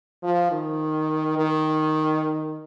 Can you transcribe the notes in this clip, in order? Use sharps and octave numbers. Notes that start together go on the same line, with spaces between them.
F3
D#3
D#3